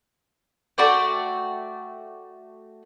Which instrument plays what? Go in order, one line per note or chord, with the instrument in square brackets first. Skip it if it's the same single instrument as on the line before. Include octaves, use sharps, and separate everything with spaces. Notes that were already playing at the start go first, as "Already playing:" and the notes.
[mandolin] A3 F#4 D5 G5